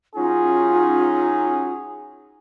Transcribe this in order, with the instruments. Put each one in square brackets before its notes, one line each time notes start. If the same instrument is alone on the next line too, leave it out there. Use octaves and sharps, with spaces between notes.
[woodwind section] F#3 C#4 D#4 [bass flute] F4 [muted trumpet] G#4